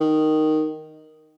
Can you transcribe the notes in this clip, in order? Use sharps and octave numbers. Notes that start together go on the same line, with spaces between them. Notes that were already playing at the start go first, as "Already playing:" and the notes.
D#3